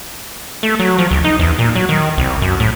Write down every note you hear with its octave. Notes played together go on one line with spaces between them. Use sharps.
A3
F#3
F3
C#2
D#4
E2
A#2
F#3
D#3
C2
F#2
A2